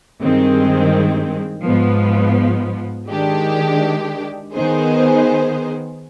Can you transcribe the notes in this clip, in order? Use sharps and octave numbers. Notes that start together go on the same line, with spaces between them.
G2 D#3 G#3 C4
G#2 F3 B3
D#3 G#3 D4 G4
D#3 B3 D#4 G#4 C5